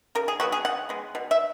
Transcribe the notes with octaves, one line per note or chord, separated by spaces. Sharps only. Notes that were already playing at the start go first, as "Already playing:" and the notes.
C#3 A#4
G#4
F#3 B3 F#4
G#4
C#3 F#5
G#3 B3
B2
E5